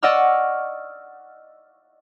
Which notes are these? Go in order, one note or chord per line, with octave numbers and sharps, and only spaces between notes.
D5 D#5 F#5 C#6 E6 F6